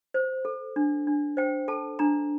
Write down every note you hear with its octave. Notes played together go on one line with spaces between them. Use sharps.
C5
A4
D4
D4
C5 G5
A4 A5
D4 A#5